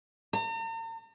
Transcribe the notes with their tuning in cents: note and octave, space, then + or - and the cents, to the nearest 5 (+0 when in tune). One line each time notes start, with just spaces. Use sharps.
A#5 -45